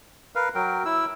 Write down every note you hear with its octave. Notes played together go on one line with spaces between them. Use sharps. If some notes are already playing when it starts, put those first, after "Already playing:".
A#4 B4 F5
F#3 A#4 G5
E4 E6